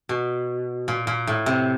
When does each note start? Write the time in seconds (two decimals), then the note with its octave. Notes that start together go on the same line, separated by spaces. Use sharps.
0.09 B2
0.88 A#2
1.07 A#2
1.27 A2
1.46 C3